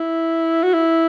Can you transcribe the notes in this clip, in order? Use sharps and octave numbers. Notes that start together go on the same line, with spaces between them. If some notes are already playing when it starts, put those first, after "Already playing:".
Already playing: E4
F#4
E4